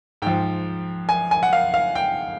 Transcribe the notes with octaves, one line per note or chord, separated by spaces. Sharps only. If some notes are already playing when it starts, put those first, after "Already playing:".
G#2 F3 G5
G#5
G#5
F#5
F5
F5
G5